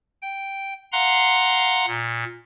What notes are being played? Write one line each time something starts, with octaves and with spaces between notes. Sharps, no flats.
G5
F5 F#5 A#5 C6 F#6
A#2